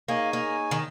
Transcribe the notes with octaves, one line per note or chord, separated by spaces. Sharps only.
A#3 D#4 G#4 C#5 G#5
A#3
D#3